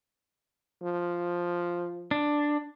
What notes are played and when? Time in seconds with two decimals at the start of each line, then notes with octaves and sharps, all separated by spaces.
0.82 F3
2.11 D4